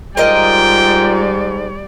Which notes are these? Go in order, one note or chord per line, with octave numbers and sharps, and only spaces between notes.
G#2 G3 F4 A#4 D5 D#5 G5